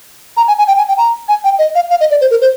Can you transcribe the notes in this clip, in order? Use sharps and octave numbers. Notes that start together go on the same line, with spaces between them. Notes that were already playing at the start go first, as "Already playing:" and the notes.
A#5
G#5
G#5
G5
G#5
G5
A#5
G#5
G5
D#5
F5
F5
D#5
D5
C5
A#4
C5